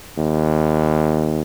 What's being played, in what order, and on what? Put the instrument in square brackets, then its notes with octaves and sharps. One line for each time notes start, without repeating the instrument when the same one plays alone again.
[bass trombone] D#2